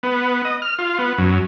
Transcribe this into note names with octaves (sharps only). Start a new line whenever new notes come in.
B3
D#5
F6
F4
B3
F#2